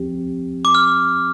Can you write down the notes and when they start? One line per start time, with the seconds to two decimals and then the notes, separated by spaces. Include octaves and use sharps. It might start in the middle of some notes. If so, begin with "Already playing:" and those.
Already playing: F3 C4 G4
0.65 D6
0.75 F6